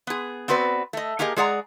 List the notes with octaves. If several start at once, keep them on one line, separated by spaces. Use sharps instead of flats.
B3 G#4
B3 C4 F#4 B4 D5
A3 D#5
A#3 G4 G#4 A#4 D#5
G#3 G#4 D5 F#5 A#5